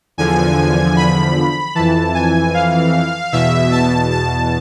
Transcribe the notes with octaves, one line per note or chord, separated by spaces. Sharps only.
E2 D3 F3 G#5
B5
F2 E3 A5
G#5
F5
E2 B2 E5
A5
A5